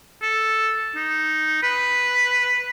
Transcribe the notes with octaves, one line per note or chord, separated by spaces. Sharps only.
A4
D#4
B4